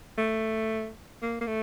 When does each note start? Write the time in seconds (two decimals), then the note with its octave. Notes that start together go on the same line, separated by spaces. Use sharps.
0.18 A3
1.22 A#3
1.41 A#3
1.47 A3